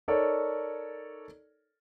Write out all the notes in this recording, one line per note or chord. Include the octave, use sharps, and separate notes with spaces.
D#4 A4 A#4 C#5 D5